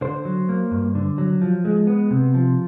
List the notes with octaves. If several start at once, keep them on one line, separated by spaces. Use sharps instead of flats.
D3 C5
F#3
A#3
G2
D3
F#3
F3
G#3
B3
C3
F3